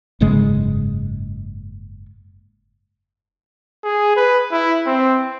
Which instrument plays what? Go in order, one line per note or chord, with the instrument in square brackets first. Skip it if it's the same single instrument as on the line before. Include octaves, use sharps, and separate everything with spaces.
[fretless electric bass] F#1 G#2 C#3 G#3
[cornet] G#4
B4
E4
C4